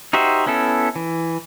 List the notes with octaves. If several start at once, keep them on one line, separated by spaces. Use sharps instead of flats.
D#4 F#4 G4 C5 E5
B3 C#4 E4 A4
E3